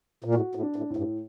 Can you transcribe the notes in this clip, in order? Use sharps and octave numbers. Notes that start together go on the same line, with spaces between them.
A#2
A2 F#4
A2
D4
A2
A2
G2